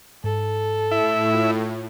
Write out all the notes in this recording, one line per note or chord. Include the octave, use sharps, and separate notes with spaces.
G#2 A4
A2 E4 E5
F4